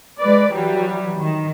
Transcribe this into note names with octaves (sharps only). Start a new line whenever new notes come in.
G#3 B4 D5
E3 F#3 G3
D#3